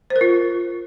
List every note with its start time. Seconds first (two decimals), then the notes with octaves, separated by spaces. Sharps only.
0.10 C5
0.16 A#4
0.21 F4